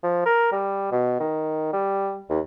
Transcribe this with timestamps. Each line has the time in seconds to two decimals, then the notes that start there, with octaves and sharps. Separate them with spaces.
0.03 F3
0.26 A#4
0.52 G3
0.92 B2
1.20 D#3
1.73 G3
2.30 D#2